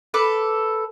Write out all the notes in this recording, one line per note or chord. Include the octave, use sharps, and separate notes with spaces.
A4 B4 D6